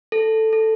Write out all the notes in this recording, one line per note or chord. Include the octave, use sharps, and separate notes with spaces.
A4
A4